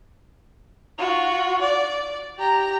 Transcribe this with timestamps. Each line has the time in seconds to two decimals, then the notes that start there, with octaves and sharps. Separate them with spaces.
0.98 F4 F#4
1.61 D5
2.39 G4 A#5